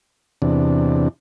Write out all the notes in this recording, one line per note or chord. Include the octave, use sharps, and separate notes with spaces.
E2 C3 D4